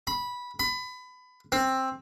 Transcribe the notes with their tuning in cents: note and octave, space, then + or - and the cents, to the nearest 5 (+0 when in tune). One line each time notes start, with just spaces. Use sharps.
B5 -10
B5 +25
C4 +10